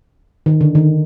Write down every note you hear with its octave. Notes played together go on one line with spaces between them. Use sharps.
D#3
D3
D#3